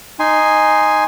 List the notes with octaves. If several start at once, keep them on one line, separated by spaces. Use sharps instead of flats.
D#4 G#5 C6